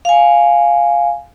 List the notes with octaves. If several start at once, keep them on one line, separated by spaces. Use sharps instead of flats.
F5 G#5